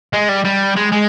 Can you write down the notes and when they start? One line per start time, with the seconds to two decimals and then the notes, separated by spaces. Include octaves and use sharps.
0.13 G#3
0.29 G3
0.45 G3
0.77 G#3
0.92 G#3